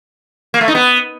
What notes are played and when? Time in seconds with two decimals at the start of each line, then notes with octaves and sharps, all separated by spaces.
0.54 A#3
0.61 A3
0.68 D#4
0.75 B3